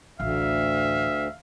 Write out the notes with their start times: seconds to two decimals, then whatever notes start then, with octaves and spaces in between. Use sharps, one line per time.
0.20 A1 D2 E5 F5